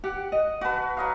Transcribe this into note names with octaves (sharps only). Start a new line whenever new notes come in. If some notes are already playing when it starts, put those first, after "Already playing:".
G4 F#5
D#5
F#4 B4 F#5 A5
F#3 D#5 F5